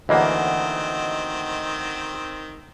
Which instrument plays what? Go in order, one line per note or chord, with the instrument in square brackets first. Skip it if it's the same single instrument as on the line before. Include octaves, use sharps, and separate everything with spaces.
[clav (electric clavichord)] D2 E3 A#3 [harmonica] D#3 C4 [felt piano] D#5 F#5